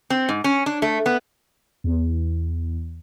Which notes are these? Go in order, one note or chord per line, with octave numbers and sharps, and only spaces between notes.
C4
G#2
C#4
D4
A3
B3
E2